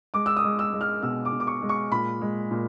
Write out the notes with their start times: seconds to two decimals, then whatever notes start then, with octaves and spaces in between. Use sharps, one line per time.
0.14 G#3 D6
0.26 E6
0.37 D#6
0.44 G#3
0.59 E6
0.73 G#3
0.81 F6
1.02 B2 E6
1.25 D6
1.32 B2
1.40 D6
1.47 C#6
1.62 G#3
1.69 C#6
1.92 A#2 B5
2.21 G#3
2.51 A#2